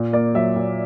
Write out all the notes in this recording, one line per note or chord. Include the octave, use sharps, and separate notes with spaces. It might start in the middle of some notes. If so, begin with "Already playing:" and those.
Already playing: A#2
A#3 D5
F#3 E5
A#2